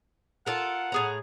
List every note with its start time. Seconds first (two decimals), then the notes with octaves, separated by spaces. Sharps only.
0.46 F4 A4 A#4 F#5
0.92 A2 G#4 A#5